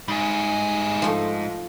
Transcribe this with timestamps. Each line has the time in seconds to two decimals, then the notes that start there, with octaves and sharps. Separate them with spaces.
0.08 G#2 G3 G#4
1.02 F3 A3